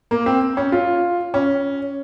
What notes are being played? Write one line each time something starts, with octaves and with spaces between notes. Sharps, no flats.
A#3
C4
C#4
F4
C#4